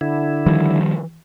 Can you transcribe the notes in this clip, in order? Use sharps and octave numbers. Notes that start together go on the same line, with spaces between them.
D3 E4
D#3 F3 G3